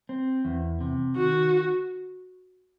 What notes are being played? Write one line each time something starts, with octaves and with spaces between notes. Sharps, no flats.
C4
E2
C3
D#3 F#4